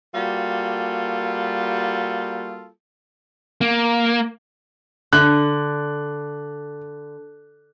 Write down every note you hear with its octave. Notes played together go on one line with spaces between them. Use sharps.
G3 A#3 F4 F#4 A4
A#3
D3 F#6